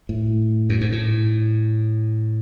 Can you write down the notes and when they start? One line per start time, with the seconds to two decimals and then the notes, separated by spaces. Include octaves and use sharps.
0.09 A2
0.69 F#2
0.81 G#2
0.92 A2